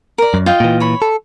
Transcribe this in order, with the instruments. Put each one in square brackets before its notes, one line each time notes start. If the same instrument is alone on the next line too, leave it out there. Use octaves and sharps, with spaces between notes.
[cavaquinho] A#4 D5
[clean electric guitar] F#2
[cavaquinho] F4 D#5 G5
[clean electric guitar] A#2 E3
[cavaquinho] C#5 B5
[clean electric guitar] A4